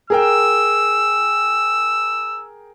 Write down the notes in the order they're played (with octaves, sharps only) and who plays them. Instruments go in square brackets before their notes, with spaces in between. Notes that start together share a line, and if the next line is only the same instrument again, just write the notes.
[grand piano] G#4 A#4 G5 [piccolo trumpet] E6